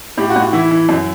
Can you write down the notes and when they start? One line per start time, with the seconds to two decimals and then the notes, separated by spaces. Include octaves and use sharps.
0.17 A2 G4
0.30 F#4
0.36 A2
0.42 F#4
0.53 E3 E4
0.71 E3
0.89 F#2